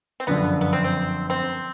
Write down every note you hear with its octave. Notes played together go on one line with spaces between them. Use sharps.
C4
G1 F#2 D3 F3 B3
B3
C4
C4
C4